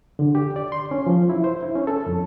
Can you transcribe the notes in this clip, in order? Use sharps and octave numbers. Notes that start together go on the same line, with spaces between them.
D3
G4
D5
C6
C#4
F3
E4
C5
E4
C#4
A4
F2